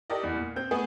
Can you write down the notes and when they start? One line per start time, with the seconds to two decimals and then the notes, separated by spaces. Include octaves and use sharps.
0.10 G4 A4 A#4 D5 D#5
0.23 E2
0.35 A#2
0.56 C4 G6
0.71 A3 B3 G#4